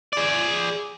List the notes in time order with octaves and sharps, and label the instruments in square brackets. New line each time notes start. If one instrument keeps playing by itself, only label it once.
[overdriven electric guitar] G#4 D5